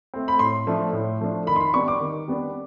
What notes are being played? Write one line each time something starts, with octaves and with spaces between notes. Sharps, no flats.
A3 C4
B5
A2 C6
F3 A3 D4
A2
F3 A3 D4
D#3 B5
C6
B5
G3 B3 D4 C#6
D6
D#3
G3 B3 D4